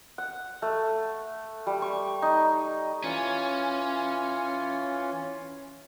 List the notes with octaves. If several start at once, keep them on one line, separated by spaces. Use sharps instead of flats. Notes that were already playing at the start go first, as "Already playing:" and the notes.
F#5
A3
G3
C#6
D#4
E3 C#4 F4